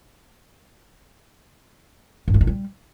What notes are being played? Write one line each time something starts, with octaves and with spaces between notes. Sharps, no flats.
G2
A3
G2
G3